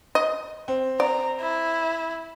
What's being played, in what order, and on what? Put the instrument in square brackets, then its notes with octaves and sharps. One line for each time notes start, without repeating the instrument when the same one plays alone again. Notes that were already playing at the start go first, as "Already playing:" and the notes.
[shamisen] D#5
[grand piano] C4
[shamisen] D5 [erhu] A#5
[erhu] E4